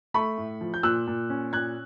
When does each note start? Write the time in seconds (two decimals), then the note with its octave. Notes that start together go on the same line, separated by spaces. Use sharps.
0.14 A3 B5 C#6
0.38 A2
0.61 F3
0.74 G6
0.83 A#2 E6 F#6
1.07 A#2
1.30 C#4
1.53 A#2 F#6 G#6